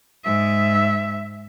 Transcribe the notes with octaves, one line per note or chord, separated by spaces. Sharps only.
G#2 E5